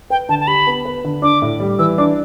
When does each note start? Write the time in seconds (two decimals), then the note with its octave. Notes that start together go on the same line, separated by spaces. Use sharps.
0.10 B4 G5
0.29 D3 A5
0.40 A5
0.48 G4 B5
0.67 B3
0.85 B4
1.04 D3
1.22 D4 D6
1.42 A2
1.60 G3
1.79 E3 E6
1.98 D4 D6